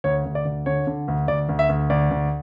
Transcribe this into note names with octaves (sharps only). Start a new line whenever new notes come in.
D2 C#5
D2
D5
D2
D3 C#5
D3
D2
D2 D5
D2
E5
D2
D2 D5
D2